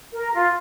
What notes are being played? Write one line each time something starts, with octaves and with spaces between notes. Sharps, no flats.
A#4
F4